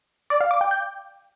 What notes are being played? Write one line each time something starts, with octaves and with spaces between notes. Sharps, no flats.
D5
F5
D6
G5
G6